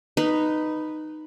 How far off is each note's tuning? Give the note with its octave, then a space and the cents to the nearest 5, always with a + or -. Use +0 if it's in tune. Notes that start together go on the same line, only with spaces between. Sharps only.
D#4 -10 B4 +0